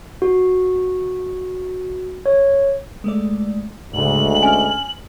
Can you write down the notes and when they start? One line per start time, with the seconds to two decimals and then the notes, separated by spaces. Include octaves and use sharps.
0.22 F#4
2.26 C#5
3.04 G#3 A3 D5
3.94 D2 G#2 C#3 G#3 F#7
4.43 C#4 G#5 F6